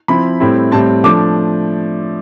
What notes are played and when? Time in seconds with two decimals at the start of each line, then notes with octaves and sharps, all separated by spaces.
0.08 F3 C4 E4 B5
0.40 A2 G3 C4 E4
0.72 A2 G3 C4 A5
1.04 F3 A3 D4 D6